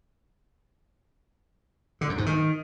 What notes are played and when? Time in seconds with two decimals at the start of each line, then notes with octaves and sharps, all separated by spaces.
2.01 D3
2.09 F#2
2.18 G#2
2.26 D#3